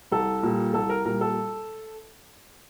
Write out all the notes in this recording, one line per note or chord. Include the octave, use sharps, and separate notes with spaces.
C2 A4
A#2 G3
C2 A4
A#4
A#2 G3 A#4
A4